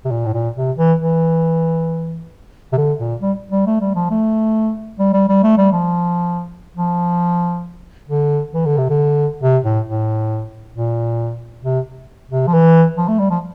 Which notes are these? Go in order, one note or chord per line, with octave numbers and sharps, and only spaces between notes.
C3
A#2
A2
A#2
C3
E3
E3
C3
D3
A#2
G3
G3
A3
G3
F3
A3
G3
G3
G3
A3
G3
F3
F3
D3
E3
D3
C3
D3
C3
A2
A2
A#2
C3
C3
F3
E3
F3
A3
G3
F3